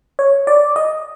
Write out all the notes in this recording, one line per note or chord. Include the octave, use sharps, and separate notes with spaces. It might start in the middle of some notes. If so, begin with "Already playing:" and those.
C#5
D5
D#5